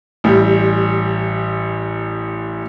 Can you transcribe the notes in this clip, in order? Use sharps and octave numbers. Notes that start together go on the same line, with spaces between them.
A1 G3